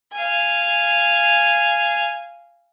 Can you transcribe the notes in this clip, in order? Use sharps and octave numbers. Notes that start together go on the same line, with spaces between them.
F5 G#5